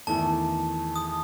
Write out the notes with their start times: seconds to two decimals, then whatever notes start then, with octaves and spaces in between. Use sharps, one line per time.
0.07 E2 D#3 A3 E4 A4 A5
0.96 D#6